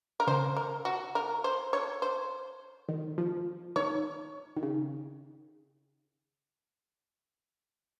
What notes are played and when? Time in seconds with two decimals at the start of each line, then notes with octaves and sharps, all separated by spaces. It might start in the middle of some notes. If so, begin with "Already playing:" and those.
0.20 A#4
0.27 C#3 C5
0.56 A#4
0.85 F#4
1.15 A#4
1.44 C5
1.73 C#5
2.02 C5
2.89 D#3
3.18 F3
3.76 D#3 C#5
4.57 D#3
4.63 C#3